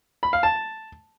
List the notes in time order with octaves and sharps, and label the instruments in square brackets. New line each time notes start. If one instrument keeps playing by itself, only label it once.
[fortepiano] B5
F5
A5